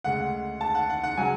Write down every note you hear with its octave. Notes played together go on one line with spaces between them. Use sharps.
D2 C#3 G#3 F#5
A5
F#5
F#5
F#5
C#3 F#3 G#5